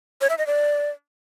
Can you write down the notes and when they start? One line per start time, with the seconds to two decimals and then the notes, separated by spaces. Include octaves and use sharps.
0.21 C#5
0.30 E5
0.38 D#5
0.47 D5